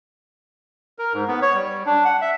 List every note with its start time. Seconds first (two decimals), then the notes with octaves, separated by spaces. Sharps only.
0.99 A#4
1.14 G#2
1.28 B3
1.42 C#5
1.54 G3
1.86 D4
2.05 F#5
2.21 E5